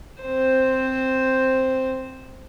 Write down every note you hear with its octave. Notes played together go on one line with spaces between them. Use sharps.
C4 C5